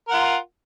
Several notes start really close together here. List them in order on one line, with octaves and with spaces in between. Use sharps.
A#4 F#5 F4